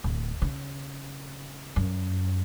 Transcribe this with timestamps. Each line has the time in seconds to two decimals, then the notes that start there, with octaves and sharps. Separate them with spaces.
0.04 D1
0.42 C#3
1.76 F#2